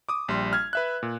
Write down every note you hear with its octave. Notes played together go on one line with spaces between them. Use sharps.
D6 D#6
A#1 G3 C6
F6 G#6
B4 E5 F#6
A#2